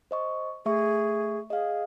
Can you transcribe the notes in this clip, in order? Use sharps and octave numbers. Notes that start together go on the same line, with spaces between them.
C5 D#5 C#6
A3 G#4 E5 C#6
G#4 D#5 F5